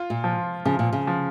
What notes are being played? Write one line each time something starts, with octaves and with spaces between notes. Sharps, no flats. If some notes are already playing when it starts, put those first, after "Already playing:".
Already playing: F4
A#2
F3
C#3 F3
A#2
C#3
F3